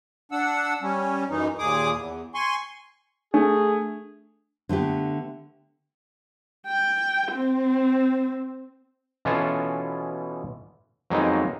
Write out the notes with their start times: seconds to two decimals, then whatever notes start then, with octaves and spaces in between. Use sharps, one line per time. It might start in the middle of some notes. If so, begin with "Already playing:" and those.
0.32 D4 F#5 E6
0.82 G3 C#4
1.29 F#2 E3 D#4
1.59 D#2 A#2 G#4 D6 D#6
1.92 E2
2.34 G#5 C6 C#6
3.34 A3 D4 G#4
4.69 D3 A3 B3 G4
6.67 G5
7.32 C4
9.25 B2 E3 B3 C#4 F4 A4
11.10 F2 F#3 G#3 A#3 B3 D#4